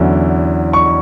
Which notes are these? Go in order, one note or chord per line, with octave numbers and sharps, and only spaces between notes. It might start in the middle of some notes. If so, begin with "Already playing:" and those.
Already playing: E2 D3 F#3 C#4 E4
C#6